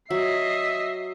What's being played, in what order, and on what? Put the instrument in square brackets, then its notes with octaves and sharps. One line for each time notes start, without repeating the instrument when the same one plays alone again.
[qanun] F#3 [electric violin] D#5 C7 [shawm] E5